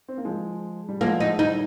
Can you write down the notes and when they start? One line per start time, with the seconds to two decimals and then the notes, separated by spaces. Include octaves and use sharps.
0.08 C4
0.18 A#3
0.25 F3 G#3
0.89 G3
1.01 F3 G#3 A#3
1.20 D#4
1.39 D#3 G3 D#4